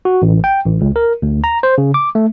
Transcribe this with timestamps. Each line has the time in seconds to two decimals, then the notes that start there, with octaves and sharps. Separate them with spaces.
0.05 F#4
0.22 A1
0.44 G5
0.66 A1
0.81 C#2
0.96 A#4
1.22 D2
1.44 A#5
1.63 C5
1.78 C#3
1.94 D6
2.15 A3